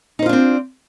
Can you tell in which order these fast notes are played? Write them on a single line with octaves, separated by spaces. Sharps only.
D#4 C5 F4 D4 C4